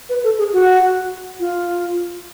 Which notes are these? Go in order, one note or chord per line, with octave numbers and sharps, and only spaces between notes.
B4
A4
G#4
F#4
F4